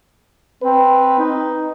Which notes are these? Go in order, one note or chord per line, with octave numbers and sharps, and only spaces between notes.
C4 B4
D#4